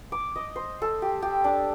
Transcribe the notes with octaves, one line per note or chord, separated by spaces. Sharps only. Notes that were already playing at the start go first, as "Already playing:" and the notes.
D6
D#5
C5
A4
G4
G4
D4